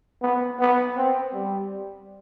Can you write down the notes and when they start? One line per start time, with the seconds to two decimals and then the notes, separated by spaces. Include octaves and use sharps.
0.22 B3
0.60 B3
0.97 C4
1.34 G3